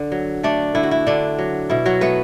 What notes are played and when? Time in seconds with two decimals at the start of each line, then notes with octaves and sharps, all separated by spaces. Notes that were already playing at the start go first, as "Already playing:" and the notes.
Already playing: D3
0.12 F#3
0.43 A3 D4 D5
0.75 D3 E4
0.83 F#4
0.91 E4
1.07 D3 D4
1.39 F#3
1.70 B2 E4
1.86 F#3 F#4
2.01 A3 B3 B4